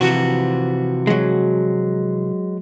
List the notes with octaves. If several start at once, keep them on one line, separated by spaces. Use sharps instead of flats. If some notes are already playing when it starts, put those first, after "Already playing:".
C3 E3 F3 F#4
F#3 G#3